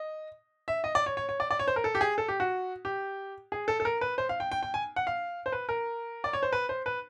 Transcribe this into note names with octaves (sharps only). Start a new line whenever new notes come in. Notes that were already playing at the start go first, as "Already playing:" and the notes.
Already playing: D#5
E5
D#5
D5
C#5
C#5
C#5
D5
D5
C#5
C5
A#4
A4
G4
G#4
A4
G4
F#4
G4
G#4
A4
A4
A#4
B4
C5
F5
G5
G5
G5
G#5
F#5
F5
C5
B4
A#4
D5
C#5
C5
B4
C5
B4